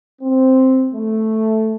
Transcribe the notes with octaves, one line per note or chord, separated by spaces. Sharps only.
C4
A3